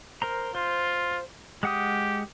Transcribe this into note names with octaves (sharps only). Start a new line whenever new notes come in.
A#4 C5 A#5
F4 C5
G#3 G4 F#5 D#6